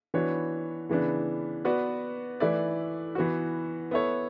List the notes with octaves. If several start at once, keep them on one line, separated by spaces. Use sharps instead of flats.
E3 B3 D4 F#4 C#5
C#3 E3 B3 D4
B3 F#4 B4 D5
E3 A3 E4 B4 D5
E3 B3 F#4
B3 E4 A4 C#5